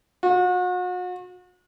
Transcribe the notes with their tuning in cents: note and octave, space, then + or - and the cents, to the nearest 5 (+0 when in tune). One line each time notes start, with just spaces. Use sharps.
F#4 -40